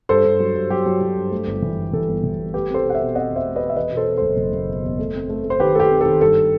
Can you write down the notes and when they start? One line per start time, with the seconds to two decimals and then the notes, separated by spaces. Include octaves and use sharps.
0.09 G2 A4 C5
0.25 G2
0.40 F#3
0.55 G2
0.70 F#3 G4
0.86 F#3
1.01 F#3
1.16 G2
1.31 A3
1.47 G1
1.62 E3
1.77 G2
1.93 E3 A4
2.09 G1
2.23 E3
2.39 G1
2.54 A3 G4 B4
2.70 C4 A4 C5
2.84 B2
2.90 F#5
2.95 C5 E5
3.00 B2
3.15 C4 D#5 F#5
3.31 E2
3.36 C5 E5
3.46 A3
3.56 B4 D#5
3.61 A3
3.69 E5
3.76 E2 B4 D#5
3.92 B2
3.97 A4 C5
4.07 B2
4.17 F#1 A4 C5
4.37 F#1
4.53 F#1
4.68 B2
4.83 E2
4.99 A3
5.14 C4
5.29 A3
5.44 A3
5.50 C5
5.60 D#3 G4 B4
5.75 A3 A4
5.80 G4
5.90 C4
6.01 D#3 A4
6.21 G2 A4